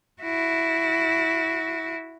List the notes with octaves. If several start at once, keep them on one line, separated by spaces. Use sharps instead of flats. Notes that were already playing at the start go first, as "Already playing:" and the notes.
E4 F#4